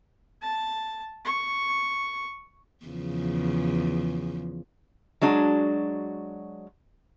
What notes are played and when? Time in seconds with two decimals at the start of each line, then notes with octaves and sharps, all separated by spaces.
0.42 A5
1.25 C#6
2.86 E2 C#3 F3
5.21 F#3 G#3 D4 F#4